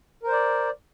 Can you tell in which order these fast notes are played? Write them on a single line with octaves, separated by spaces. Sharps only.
A#4 C5 D5